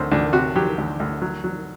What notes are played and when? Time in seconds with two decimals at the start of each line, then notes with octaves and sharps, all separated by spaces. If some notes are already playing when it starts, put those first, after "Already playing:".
Already playing: D2 C4
0.12 D2 D4
0.33 C3 F#4
0.56 F#3 G4
0.78 D2
1.00 D2
1.22 F#3
1.44 F#3